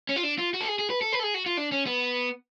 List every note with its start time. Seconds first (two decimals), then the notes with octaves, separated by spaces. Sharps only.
0.09 C#4
0.16 F4
0.23 D4
0.38 F4
0.54 F#4
0.61 A4
0.68 G#4
0.79 G#4
0.90 B4
1.02 A4
1.12 B4
1.19 A4
1.23 G#4
1.34 F#4
1.46 F4
1.57 D4
1.72 C#4
1.86 B3